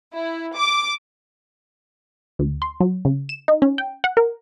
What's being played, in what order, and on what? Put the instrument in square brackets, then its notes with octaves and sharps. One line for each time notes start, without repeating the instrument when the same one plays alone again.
[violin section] E4
D6
[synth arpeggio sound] D2
C6
F#3
C#3
E7
D#4
C#4
G5
F#5
A#4